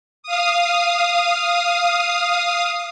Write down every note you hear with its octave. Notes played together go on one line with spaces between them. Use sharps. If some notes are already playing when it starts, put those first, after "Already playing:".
F5 D#6